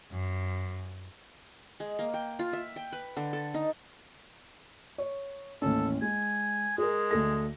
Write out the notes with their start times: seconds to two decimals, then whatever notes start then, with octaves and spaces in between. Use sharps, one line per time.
0.11 F#2
1.80 G#3
1.99 A#3
2.14 G5
2.39 F4
2.53 E5
2.76 G5
2.92 B4
3.17 D3
3.33 A4
3.54 D#4
4.98 C#5
5.62 A1 D#2 C#4 A4
6.02 G#3 G#5
6.78 G#3 G#4 A#4
7.11 D2 A4 A#6